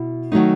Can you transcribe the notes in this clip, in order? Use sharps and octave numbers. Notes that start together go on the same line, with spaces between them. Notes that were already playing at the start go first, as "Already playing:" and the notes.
Already playing: B2 E4
D#3 F#3 A3 D#4